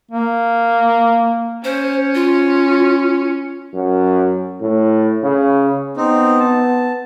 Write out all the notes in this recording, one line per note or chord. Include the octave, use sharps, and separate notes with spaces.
A#3
C#4 C5
F4
F#2
A2
C#3
B3 C4 D#4
A5